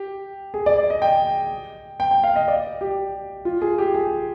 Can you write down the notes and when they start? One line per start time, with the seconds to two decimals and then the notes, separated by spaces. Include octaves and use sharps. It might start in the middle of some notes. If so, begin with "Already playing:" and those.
Already playing: G4
0.54 G#4
0.66 D5
0.78 D5
0.90 D#5
1.02 G5
2.00 G5
2.11 G5
2.24 F5
2.36 D#5
2.48 D5
2.81 G4
3.45 F4
3.62 G#4
3.78 G4
3.94 G#4